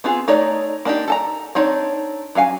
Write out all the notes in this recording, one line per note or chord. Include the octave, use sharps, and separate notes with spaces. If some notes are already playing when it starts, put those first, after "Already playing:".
B3 C4 F4 G#4
A3 D#4 C#5 D5 A#5
A#3 D4 D#4 G4
A4 A5 A#5
C4 D4 D#4 C#5
F#3 C#4 F5 G#5